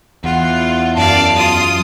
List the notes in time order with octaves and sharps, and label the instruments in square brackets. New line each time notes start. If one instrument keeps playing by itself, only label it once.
[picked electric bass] E2 [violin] F4 [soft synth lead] F#5
[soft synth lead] F#2 [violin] D5 F5 [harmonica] A5
[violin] F4 D#6